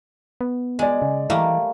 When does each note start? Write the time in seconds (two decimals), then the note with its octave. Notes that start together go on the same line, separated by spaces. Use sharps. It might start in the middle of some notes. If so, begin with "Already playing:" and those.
0.41 B3
0.79 G#3 D5 G#5
1.02 C#3
1.30 E3 G3 A3 A#3